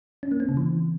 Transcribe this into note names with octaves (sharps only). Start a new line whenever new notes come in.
C#4
A#3
C4
C#3
E3